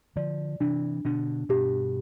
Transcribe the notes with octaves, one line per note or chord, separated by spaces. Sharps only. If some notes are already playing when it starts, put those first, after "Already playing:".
D3 F3 D5
C3 E3 D4
B2 D3 D4
G2 B2 G4